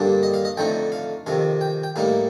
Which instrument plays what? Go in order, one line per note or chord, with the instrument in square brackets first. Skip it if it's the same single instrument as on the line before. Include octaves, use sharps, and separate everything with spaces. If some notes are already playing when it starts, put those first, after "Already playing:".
Already playing: [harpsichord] G2 D3 G3 A#3 D4
D#5
F5
D#5
F2 D3 A3 D#4 G5
F5
F2 C3 D#3 F5
G5
G5
A2 G3 A#3 D#4 F5